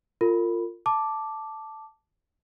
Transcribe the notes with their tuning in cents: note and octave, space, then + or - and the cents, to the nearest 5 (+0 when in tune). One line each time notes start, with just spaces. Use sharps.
F4 +0 A#4 -35 B5 +0
A5 +0 D6 +0